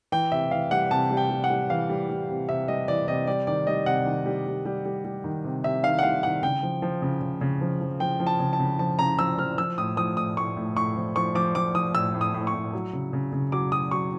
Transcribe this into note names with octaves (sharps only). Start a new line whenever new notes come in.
E3 G5
C3 E5
E3 F5
G3 F#5
C3 A5
G3
G5
G3
F#5
G3
E3 F5
G3
G3
C3
C3 E5
G3 D#5
E3 D5
C3 D#5
G3 D5
D#3 D5
G3 D#5
C3 F#5
D#3
G3
G3
G3
G3
G3
D#3
C3
C3 E5
D#3 F5
F#5
G3 F5
D#3 F#5
C#3 G5
F3
F3
C#3
C#3
C#3
F3
F3
F3 G5
F3
A5
C#3
A5
C#3
F3 A5
C#3 A#5
F3 E6
F3 F6
F3 E6
A2 D#6
F3 D#6
A2 D#6
A2 C#6
A2
A2 C#6
F3
F3 C#6
F3 D6
F3 D6
F3 D#6
A2 E6
A2
D#6
A2
C#6
A2
F#3
C#3
C#3
C#3
F#3 D6
F#3 D#6
F#3 C#6